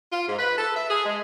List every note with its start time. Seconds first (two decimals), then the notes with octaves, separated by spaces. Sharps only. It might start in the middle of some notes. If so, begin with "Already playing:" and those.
0.12 F4
0.27 G#2
0.39 B4
0.58 A4
0.75 E5
0.90 G#4
1.06 G#3